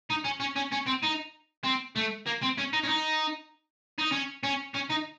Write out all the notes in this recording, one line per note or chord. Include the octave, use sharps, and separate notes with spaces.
D#4
C#4
C#4
C#4
C#4
C4
D#4
C4
A3
A#3
C4
C#4
D#4
C#4
D#4
D#4
C#4
C#4
C#4
D#4